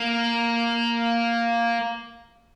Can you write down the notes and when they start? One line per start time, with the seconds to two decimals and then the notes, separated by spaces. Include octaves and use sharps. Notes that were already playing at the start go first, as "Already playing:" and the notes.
Already playing: A#3